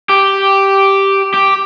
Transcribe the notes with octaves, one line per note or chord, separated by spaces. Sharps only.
G4
G4